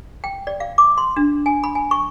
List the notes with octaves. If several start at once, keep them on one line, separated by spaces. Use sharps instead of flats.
G5
D5
F5
D6
C6
D4
G#5
B5
G#5
C#6